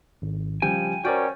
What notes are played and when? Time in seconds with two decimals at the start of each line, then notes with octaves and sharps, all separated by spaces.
0.22 G#1
0.62 C#3 F3 G3 G5 G#5
1.05 C#4 F#4 A#4 C5 D5 G5